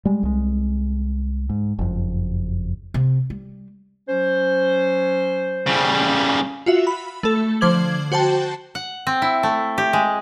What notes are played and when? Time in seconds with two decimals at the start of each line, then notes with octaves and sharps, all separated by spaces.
0.05 G3 G#3
0.23 C2 G#3
1.50 G#2
1.79 F#1 F2
2.94 C3
3.30 G3
4.09 F#3 C#4 C5
5.67 C#3 G3
6.66 F4 F#4 E5
6.87 B5
7.23 A3 A4
7.61 D3 F3 C5 D6 G#6 F#7
8.12 F#4 C5 G5 A5
8.75 F#5
9.07 C4
9.22 E4
9.43 A3
9.78 G4
9.93 G#3